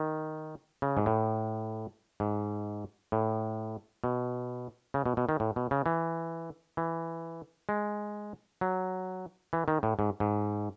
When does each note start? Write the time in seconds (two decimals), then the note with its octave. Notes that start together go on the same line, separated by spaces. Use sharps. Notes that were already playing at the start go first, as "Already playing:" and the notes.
Already playing: D#3
0.82 C#3
0.97 G#2
1.06 A2
2.20 G#2
3.12 A2
4.04 B2
4.94 C#3
5.06 B2
5.17 B2
5.29 D#3
5.40 A2
5.56 B2
5.71 C#3
5.86 E3
6.77 E3
7.69 G#3
8.61 F#3
9.53 E3
9.68 D#3
9.83 A2
9.99 G#2
10.20 G#2